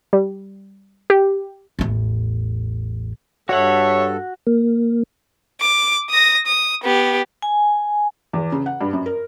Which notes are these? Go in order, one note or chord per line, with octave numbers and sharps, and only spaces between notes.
G3
G4
A1 E2
G2 F#4 A4 C#5 E5 F#5
A#3
D6
D#6 A#6
D#6
B3 G4
G#5
E2
C#3
F#5
G2
F#2
A#4